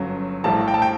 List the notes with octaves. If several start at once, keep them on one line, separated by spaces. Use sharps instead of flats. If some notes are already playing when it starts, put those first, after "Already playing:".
Already playing: G1 F#2 F#3
A#1 A2 G3 A5
G5
A5
G5